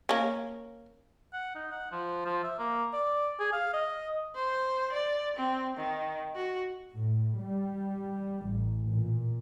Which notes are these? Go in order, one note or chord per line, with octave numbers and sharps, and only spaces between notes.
A#3 C#4
F#5
D#4
F#5
F3
F3
E5
A#3
D5
G#4
F5
D#5
C5
D5
C4
D#3
F#4
A2
G3
A1
A#2